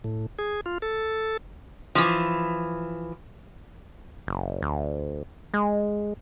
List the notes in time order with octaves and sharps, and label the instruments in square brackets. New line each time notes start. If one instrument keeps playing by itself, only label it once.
[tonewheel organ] A2
G#4
F4
A4
[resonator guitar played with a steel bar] E3 F3
[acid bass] F#1
D2
G#3